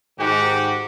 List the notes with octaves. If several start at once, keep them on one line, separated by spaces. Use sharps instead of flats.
G#2 D#3 F#4 G4